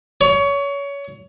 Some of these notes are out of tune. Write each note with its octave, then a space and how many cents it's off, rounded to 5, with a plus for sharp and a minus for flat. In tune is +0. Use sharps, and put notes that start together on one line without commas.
C#5 +25